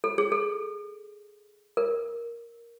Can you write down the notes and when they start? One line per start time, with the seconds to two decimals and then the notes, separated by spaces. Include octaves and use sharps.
0.04 A4
0.18 G#4
0.32 A4
1.77 A#4